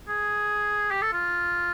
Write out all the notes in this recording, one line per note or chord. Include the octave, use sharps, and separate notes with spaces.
G#4
G4
A4
F4